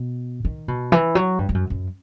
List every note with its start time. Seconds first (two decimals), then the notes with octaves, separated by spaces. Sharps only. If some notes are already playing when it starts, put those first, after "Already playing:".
Already playing: B2
0.45 D#3
0.68 B2
0.92 E3
1.15 F#3
1.39 G2
1.49 G2
1.54 F#2
1.70 F#2